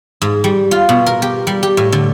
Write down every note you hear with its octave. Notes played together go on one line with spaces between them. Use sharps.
G#2
G3
F4
B2
A#4
G4
G3
G4
A2
D3